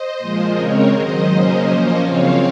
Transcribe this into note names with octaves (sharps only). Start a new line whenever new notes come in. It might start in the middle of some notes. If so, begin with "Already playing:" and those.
Already playing: C5 D#5
A#2 F3 G#3
C#3 G#3 C4 A#4 C#5
G#2 D#3 F#3 C5 D#5
C#3 F#3 A#3 C#4
A#2 F3 A#3 C#4 C5 D#5
F#2 C#3 F3 C4 C#5 F5